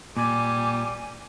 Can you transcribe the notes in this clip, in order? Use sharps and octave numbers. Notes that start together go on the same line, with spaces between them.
A#2 G3 G#5 D6